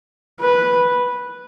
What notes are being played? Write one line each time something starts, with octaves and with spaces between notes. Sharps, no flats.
B4